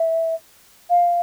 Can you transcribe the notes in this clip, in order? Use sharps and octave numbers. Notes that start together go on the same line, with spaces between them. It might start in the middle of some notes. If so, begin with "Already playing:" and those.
Already playing: E5
F5